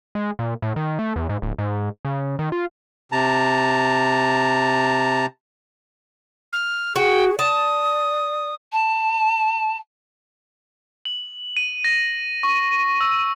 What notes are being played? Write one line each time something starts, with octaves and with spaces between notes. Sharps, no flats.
G#3
A#2
A2
D#3
A3
E2
G#2
D1
G#2
C#3
D#3
F4
C3 A5 A#5
F6
F#4 G#4 G5
D5 A5 D#6
A5
F#7
D#7
A#6
C#6
E6